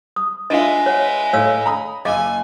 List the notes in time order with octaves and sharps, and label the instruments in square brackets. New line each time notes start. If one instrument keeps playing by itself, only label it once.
[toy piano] D#6
[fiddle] G#3 B4 [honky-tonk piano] D4 F4 E5 [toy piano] D#5
[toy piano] C#5 F#5
[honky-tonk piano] A2 [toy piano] C#5 F5 E6
[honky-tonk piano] A#5 B5 D#6
[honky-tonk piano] F#1 E6 [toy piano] D#5 F5 D6 [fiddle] G#5